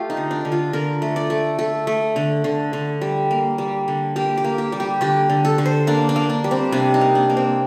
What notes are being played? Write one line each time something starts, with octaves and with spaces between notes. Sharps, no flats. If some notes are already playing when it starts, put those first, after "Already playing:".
Already playing: A3 F4 G4
D#4
D3
D4
D3
F4
D3 A#4
A3
D5
A3
A3 A4
A3
D3
D3
D3
G3
A#3
G3
D3
A#3 G4
G4
A#3
G4
G3
G4
D3 G4
D3
A4
D3
C5
A#3 D4
D4
A#3
D4
G3
C4
C3 D4
D#4
A#3
D4
A#3
C4